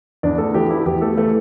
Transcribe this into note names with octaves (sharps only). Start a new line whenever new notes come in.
E2 D4 D5
A3 A4
E3 G4
E4
E2 G4
A3 A4
E3 A3 A4